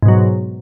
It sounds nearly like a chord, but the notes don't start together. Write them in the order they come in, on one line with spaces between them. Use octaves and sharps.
G#2 B2 F#3